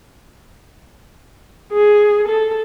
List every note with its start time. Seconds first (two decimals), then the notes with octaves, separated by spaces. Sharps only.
1.72 G#4
2.27 A4